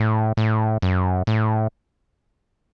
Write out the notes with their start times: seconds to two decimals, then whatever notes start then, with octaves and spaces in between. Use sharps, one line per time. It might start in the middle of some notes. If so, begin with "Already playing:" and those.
Already playing: A2
0.37 A2
0.82 F#2
1.27 A2